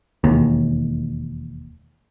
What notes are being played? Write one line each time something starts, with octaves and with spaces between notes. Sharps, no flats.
E1 D#2